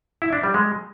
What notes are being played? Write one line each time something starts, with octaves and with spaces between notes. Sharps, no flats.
E4
D4
G3
G#3